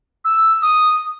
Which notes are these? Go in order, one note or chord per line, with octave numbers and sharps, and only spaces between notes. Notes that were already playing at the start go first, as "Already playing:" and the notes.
E6
D#6